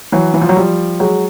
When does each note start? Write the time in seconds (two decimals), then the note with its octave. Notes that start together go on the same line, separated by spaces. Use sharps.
0.12 E3 F#3
0.34 E3
0.42 F3
0.49 F#3
0.56 F3 G3
1.00 F#3 G#3